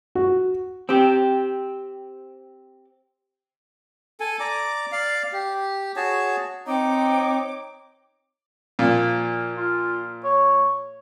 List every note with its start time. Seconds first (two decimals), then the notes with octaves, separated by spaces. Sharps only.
0.15 F#4
0.89 C4 G4
4.20 A4 G#5
4.40 D5 A#5 D6
4.92 D5 F5
5.33 G4
5.96 F#4 G#4 C#5 A5
6.67 C4 D#4 C#5 D6
8.79 A#2 F3
9.57 F4
10.24 C#5